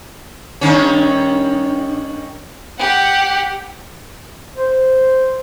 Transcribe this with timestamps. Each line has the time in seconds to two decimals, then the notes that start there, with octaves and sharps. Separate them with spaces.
0.61 G2 D#3 C#4
2.79 G4 F#5
4.57 C5